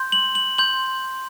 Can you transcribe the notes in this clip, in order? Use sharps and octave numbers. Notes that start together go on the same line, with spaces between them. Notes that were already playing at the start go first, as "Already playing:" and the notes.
Already playing: C6 G6
F#7
F#7
C6 G6 F#7